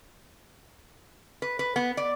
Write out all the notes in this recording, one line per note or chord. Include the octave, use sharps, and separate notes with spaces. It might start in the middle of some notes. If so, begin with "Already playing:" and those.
B4
B4
B3
D5